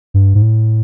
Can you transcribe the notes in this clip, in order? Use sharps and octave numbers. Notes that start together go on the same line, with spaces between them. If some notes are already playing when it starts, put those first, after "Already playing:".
G2
G#2
A2